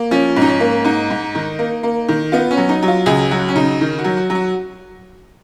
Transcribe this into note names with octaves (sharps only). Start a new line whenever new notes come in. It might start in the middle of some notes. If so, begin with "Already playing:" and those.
Already playing: A#3
F3 C#4
G#2
D#4
C#4
A#3
G#2 D#4
G#2
D#3
A#3
A#3
D#3
B3 F4
C#4
F#3
D#4
F#3
F4
C#2 G#4
F#3 F#4
C#4
C#3 D#4
D#3
F#4
F#3
F#4
F#3
F#4